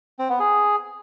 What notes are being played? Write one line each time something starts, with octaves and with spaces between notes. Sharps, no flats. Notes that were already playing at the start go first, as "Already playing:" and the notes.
C4
B3
G#4